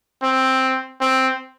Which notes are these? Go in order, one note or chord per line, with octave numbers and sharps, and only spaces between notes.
C4
C4